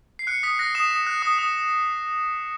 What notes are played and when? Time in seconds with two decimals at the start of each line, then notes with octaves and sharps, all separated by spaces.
0.19 C7
0.27 F#6 C#7
0.43 D#6 B6
0.59 F#6 A#6
0.75 D#6 E7
0.91 D#6
1.06 F#6
1.22 D#6
1.38 D#6